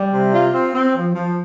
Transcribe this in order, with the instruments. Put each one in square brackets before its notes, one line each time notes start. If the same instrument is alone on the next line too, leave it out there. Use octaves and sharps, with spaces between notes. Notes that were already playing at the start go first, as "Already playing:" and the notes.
Already playing: [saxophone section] G3
C3
F4
C4
C4
F3
F3